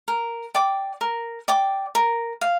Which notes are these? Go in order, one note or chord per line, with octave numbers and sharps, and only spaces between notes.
A#4
D5 G5 D6
A#4
D5 G5 D6
A#4
F5